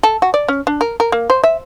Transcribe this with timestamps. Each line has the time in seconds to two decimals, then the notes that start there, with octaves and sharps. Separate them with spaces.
0.03 A4
0.22 F#4
0.34 D5
0.48 C#4
0.67 D4
0.81 A#4
1.00 A#4
1.12 A#3
1.30 C5
1.44 E5